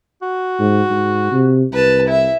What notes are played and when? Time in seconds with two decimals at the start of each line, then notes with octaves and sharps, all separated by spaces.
0.22 F#4
0.60 G#2
0.90 G#2
1.32 C3
1.72 C2 B4 A5
2.07 E4 E5